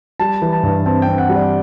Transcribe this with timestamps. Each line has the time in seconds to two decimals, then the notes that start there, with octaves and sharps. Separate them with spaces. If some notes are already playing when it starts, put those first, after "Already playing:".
0.20 G3 A5
0.42 E3
0.52 A5
0.63 G2
0.86 C4 A5
1.02 G5
1.08 C4
1.18 F#5
1.29 G3
1.35 D5